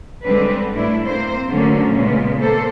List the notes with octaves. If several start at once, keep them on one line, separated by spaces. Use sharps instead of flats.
D3 G3 G#3 C4 D4 B4
A2 A3 D4 E4
A#3 C4 C5
D3 F#3 A3 A#3 C#4
A#2 C#3 G#3 B3
A#3 A4 C5